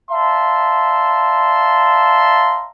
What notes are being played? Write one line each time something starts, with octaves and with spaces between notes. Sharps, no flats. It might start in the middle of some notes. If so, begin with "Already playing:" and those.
D5 E5 F5 A5 A#5 C6